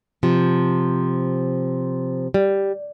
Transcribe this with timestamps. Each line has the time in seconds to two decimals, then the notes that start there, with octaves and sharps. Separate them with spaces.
0.23 C3 F3
2.34 G3